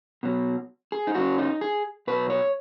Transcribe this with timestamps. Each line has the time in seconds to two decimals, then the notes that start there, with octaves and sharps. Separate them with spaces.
0.23 B2 F#3
0.92 G#4
1.07 D#4
1.15 F#2 C#3 F#3 F#4
1.38 D#4
1.61 G#4
2.07 B2 F#3 B4
2.30 C#5